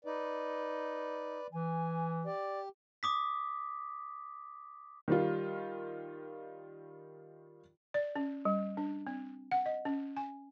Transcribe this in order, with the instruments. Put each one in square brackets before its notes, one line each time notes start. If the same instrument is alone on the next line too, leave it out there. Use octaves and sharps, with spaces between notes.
[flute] D#4 [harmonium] B4 D5
[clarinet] E3 [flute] G#5
[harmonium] G4 [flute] D5
[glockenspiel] D6 D#6 B6
[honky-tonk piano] D#3 G3 F4
[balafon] D5
C#4
G3
D4
C4
F#5
D#5
C#4
G#5